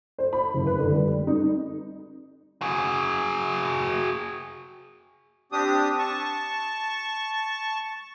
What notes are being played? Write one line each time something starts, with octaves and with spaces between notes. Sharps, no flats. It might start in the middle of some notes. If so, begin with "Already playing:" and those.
C5
B5
F#1
B4
D3
G3
G3
D#4
F#4 G#4
C4 D4 G4 D#6
A5 C#6